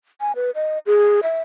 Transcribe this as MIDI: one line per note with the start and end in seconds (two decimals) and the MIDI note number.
0.21 0.32 80
0.36 0.51 71
0.55 0.79 75
0.86 1.20 68
1.23 1.41 76